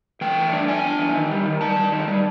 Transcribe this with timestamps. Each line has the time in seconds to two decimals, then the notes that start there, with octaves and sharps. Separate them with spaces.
0.21 E3 G5
0.37 A3
0.53 D4
0.68 D4 G#5
0.84 D4
0.99 E3
1.15 D#3
1.30 G3
1.45 D#3
1.61 G3 A5
1.76 G3
1.92 D#3
2.08 G3